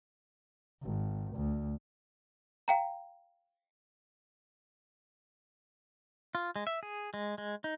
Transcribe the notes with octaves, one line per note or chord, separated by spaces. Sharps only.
G#1
D2
F5 G5 A#5
F4
G#3
E5
G#4
G#3
G#3
D#4